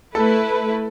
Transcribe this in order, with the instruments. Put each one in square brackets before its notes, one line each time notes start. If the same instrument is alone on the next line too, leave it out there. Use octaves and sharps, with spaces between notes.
[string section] A3 E4 B4 [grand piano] A4 A5